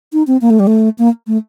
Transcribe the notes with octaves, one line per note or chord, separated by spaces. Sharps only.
D#4
C4
A#3
A3
G3
A3
A#3
A3